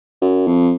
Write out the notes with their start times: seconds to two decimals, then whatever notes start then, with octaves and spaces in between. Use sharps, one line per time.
0.22 F#2
0.47 F2